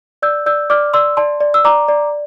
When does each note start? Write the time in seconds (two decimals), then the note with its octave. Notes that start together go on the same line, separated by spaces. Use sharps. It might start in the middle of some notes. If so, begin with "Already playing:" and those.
0.22 D5 E6 G6
0.46 D5 E6 G6
0.70 D5 D6 F6
0.94 D5 C6 E6
1.17 D5 A5 C6
1.40 D5
1.54 E6
1.64 D5 A#5 D6
1.88 D5